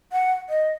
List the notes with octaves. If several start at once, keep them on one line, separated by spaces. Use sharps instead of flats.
F#5
D#5